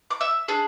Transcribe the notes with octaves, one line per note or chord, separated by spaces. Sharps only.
D6
E5 E6
D4 G#4